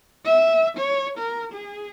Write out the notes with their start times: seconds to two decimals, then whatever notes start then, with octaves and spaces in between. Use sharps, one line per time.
0.25 E5
0.77 C#5
1.18 A#4
1.52 G#4